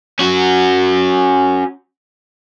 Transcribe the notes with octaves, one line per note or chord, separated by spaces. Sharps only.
C#4 F#4